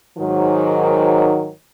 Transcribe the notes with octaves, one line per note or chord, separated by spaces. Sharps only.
G#2 D#3 F#3